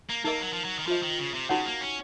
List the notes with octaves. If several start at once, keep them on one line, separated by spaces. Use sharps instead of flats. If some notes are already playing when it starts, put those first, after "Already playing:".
A#3
A#3 D#4 A#4 D#5
F#3
F3
F#3
D#3
F3 F4 C5 D#5
D#3
C#3
C3
C#3 D#4 F#4 C#5 F#5
A#3
C#4